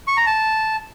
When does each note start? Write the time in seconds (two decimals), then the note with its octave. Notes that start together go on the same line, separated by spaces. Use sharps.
0.08 C#6
0.17 A#5
0.26 A5